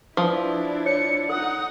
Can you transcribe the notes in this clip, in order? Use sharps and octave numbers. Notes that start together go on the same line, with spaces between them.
F3 D4 E4 B4 F5 D#6
C#5 C#7
D#4 A4 F#5 D#6